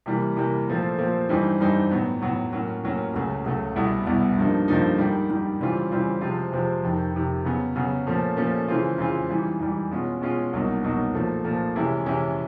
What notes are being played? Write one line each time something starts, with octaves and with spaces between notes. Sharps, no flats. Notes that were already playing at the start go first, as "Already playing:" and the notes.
C3 E3 G3 A#3
C3 E3 G3 A#3
A#2 F3 A3 C4
A#2 F3 A3 C4
G2 E3 G3 C4 D#4
G2 E3 G3 C4 D#4
A2 F#3 B3
A2 F#3 B3
A2 F#3 A#3 C#4
A2 F#3 A#3 C#4
C#2 C#3 F#3 A3
C#2 C#3 F#3 A3
C2 B2 G3 B3 E4
C2 B2 G3 B3 E4
G2 D3 F3 A#3 D#4
G2 D3 F3 A#3 D#4
G#2 D#3 G3
G#2 D#3 G3
C#3 E3 G3 C4 F4
C#3 E3 G3 C4 F4
C3 F3 G#3 C4 F4
C3 F3 G#3 C4 F4
F2 C3 D#3
F2 C3 D#3
C#3 F#3 B3
C#3 F#3 B3
A#2 F3 A3 C#4
A#2 F3 A3 C#4
C#3 E3 G#3 C4 F4
C#3 E3 G#3 C4 F4
G#2 E3 G3
G#2 E3 G3
B2 G#3 C#4 F4
B2 G#3 C#4 F4
C2 B2 F#3 A#3 D#4
C2 B2 F#3 A#3 D#4
A#2 F3 A3
A#2 F3 A3
C3 E3 G#3 C#4 E4
C3 E3 G#3 C#4 E4